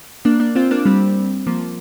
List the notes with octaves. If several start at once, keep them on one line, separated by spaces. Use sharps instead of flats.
A#3 D4
A#3 D4
C4 F4
A#3 D4
G3 C4
F3 A#3